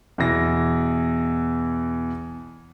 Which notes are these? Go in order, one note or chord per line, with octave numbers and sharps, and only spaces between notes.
E2 B2 E3 A#6